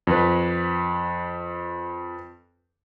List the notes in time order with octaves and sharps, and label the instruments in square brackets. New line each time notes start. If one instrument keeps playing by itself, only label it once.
[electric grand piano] F2 B4